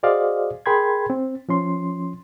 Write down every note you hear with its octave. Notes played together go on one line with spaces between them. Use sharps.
F#4 G#4 C5 D5 D#5 F5
G#4 A#4 G5 B5 C6 G#6
C4
F3 C#4 C6